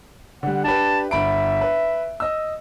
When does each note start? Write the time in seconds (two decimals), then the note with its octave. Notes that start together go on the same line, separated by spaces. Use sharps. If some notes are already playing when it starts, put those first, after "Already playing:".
0.43 D3 G3 F#5
0.64 D4 G4 B4 A5
1.11 G1 E5 B5 D7
1.61 B4
2.20 D#5 E6